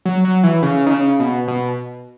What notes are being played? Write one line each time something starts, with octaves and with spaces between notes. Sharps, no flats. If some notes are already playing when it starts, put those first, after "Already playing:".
F#3
F#3
E3
C#3
D#3
C#3
B2
B2